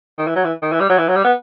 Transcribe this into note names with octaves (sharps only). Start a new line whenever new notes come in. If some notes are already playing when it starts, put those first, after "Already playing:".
D#3
E3
F#3
E3
D#3
E3
G3
F#3
E3
F#3
G3
B3